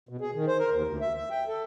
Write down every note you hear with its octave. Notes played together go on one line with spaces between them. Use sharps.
B2
G#4
D#3
C5
A#4
D#2
D2
E5
E5
G5
A4